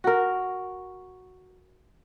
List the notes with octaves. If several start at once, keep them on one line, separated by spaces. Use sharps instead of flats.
F#4 A#4